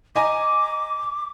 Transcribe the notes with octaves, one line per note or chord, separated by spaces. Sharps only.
D#5 G#5 A#5 D6